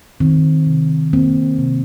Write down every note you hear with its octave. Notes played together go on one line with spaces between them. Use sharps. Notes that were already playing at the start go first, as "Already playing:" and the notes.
D#3 C4
C3
A#3 C4
C3